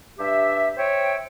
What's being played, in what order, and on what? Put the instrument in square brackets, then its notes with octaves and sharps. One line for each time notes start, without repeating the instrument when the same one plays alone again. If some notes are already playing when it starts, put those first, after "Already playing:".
[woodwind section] G2 G4 E5
C5 C#5 E5 G5